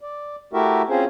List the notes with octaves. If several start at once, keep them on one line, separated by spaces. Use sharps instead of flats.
D5
A3 E4 F#4 G4 A#4 E5
C4 C#4 F4 G#4 C5